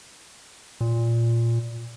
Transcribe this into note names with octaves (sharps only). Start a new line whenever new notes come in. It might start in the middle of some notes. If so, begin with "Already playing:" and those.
A#2